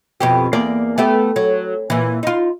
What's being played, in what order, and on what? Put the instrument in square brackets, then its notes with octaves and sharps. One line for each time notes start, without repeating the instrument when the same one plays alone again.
[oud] F2 B2 G4
E2 A#3 D5
A3 B3 G4
F#3
A#2 E3
D#4 F4